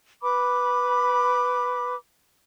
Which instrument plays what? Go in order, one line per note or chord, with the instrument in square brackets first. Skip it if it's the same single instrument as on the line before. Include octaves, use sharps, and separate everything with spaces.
[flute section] B4 B5 D6